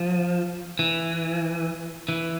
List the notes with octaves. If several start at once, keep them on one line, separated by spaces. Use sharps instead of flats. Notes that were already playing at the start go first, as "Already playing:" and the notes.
Already playing: F3
E3
E3